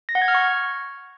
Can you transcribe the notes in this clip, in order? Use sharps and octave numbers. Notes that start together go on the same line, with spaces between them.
A#6
F#5
G#6
F6
C#6